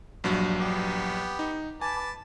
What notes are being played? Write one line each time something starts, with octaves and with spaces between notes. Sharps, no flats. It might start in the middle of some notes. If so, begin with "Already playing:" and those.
A#1 G2 F#3
B3 G4
D#4
B4 G#5 A5 D6